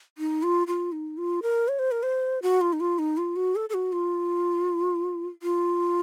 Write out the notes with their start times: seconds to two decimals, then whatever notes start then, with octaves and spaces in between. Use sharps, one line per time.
0.18 D#4
0.43 F4
0.67 F4
0.92 D#4
1.17 F4
1.42 A#4
1.68 C#5
1.79 C5
1.91 A#4
2.03 C5
2.42 F#4
2.61 F4
2.73 D#4
2.80 F4
2.99 D#4
3.17 F4
3.36 F#4
3.55 A4
3.69 A4
3.74 F#4
3.92 F4
5.42 F4